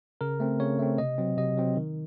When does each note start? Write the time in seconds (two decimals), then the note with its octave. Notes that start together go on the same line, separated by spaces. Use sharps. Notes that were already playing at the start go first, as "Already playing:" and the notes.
0.21 C#3 A#4
0.40 A3 C4
0.60 C#3 C#5
0.79 A3 C4
0.98 C3 D#5
1.18 F#3 C4
1.37 C3 D#5
1.58 F#3 C4
1.76 D#3